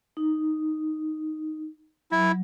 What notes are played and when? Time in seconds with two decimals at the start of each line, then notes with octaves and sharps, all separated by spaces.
0.17 D#4
2.11 F#3 E4